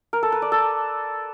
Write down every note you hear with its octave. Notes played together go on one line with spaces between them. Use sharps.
A#4
A4
B4
D5
A4